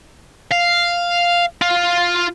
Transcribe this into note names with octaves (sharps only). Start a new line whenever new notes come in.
F5
F4